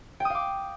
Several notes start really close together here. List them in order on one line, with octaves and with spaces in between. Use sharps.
G5 D#6 F5 D6